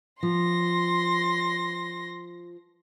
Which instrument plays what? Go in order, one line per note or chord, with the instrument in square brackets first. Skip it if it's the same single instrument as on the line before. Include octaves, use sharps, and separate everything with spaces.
[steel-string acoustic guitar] F3 [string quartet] C6 A#6